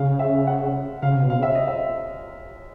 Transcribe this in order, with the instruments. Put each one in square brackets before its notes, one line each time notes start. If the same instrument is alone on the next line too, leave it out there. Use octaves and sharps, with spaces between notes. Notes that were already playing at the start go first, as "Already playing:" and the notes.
Already playing: [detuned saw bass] C#3 [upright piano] F5
[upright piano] E5
F#5
[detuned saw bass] C#3 [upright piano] F5
[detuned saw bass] C3
B2
[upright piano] F5
[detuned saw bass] C#3 [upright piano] E5
[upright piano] D#5
E5